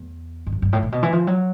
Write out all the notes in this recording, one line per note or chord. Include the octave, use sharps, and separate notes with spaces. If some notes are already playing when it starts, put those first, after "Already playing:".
Already playing: E2
G2
F#2
G2
A2
A#2
B2
E3
F3
F#3